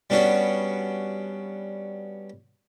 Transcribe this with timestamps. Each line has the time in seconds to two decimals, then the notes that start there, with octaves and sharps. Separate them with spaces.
0.10 G3 B3 C#4 D4 F#4